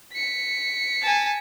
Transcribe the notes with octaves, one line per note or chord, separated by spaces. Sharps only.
B6 C#7
G#5 A5